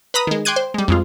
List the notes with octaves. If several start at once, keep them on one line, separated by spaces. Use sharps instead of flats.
B4 A#5 B5 D#6
D#3 G#3
G5 C6 D6 F#6 G#6 D#7
C5
G3 G#3
F2 G#3 F4